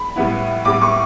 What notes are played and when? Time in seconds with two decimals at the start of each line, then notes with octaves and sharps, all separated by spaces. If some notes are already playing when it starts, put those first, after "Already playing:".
Already playing: B5
0.16 A2 G3 B3 E4
0.65 A2 G3 B3 E4 D6
0.82 C#6